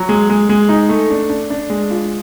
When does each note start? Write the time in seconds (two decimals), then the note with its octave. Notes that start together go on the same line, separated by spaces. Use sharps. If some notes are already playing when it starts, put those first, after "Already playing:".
Already playing: F#3
0.09 G#3
0.30 G#3
0.49 G#3
0.69 D#4
0.89 A3
1.10 D4
1.30 D4
1.50 D4
1.70 G#3
1.91 F4